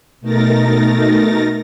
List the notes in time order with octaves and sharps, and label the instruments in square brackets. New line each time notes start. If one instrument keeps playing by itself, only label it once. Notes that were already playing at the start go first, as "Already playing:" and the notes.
[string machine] B2 A3 D#4 A#4 A6 A#6